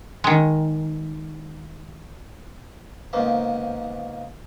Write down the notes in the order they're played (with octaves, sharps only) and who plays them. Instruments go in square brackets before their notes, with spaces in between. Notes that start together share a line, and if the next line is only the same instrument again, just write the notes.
[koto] D#3 G#3
[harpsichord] G#2 C#3 A#3 B3 C5